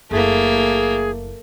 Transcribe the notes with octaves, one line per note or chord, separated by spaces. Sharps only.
F#1 A3 A#3 E4 G#4